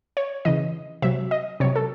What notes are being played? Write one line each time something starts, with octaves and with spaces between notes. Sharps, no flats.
C#5
C#3 E3 D#5
C3 F#3 E5
D#5
C3 F#3 C#5
A4